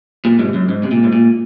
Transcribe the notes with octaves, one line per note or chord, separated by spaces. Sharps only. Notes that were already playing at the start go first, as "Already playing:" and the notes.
A#2
G#2 C3
F#2
G#2
C3
A#2
G#2
A#2